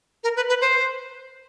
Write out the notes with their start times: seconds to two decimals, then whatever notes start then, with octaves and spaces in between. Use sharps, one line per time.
0.24 A#4
0.36 B4
0.49 B4
0.61 C5